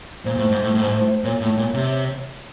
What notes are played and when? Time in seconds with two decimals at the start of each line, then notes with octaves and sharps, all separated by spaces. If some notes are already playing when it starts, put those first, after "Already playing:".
0.25 A#2 C5
0.37 A2
0.50 G#2
0.62 A2
0.75 A2
0.81 G#2
0.89 A2
1.24 A#2 C#5
1.41 A2
1.57 A#2
1.74 C3